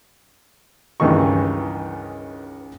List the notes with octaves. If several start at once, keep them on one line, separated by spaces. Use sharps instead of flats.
C#2 G2 D#3 E3 D#4 C#6